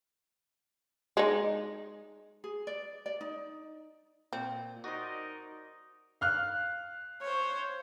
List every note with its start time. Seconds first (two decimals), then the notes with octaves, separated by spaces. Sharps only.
1.17 G#3 D#4
2.44 G#4
2.67 D5
3.06 D5
3.21 D#4
4.33 A#2 C4
4.84 D#4 F#4 A#4 C5 D5
6.21 F5 F6 F#6
7.22 C5 C#5